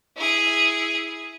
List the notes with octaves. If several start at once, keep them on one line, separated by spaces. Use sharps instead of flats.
E4 G#4